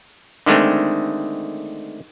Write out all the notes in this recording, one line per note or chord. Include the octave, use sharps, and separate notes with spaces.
D3 D#3 G#3 A3 C4